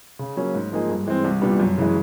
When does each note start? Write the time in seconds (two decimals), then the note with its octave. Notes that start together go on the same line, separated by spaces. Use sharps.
0.19 C#3
0.37 F#3 A#3 C#4
0.54 G#2
0.72 F3 A#3 D#4 G#4
0.90 G2
1.06 E3 G#3 C4
1.24 C2
1.42 A#2 G3 B3 D4
1.60 F#2
1.77 C#3 E3 G#3